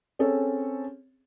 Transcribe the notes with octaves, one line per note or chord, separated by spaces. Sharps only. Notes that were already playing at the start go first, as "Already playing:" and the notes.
C4 C#4 G#4 A4 C#5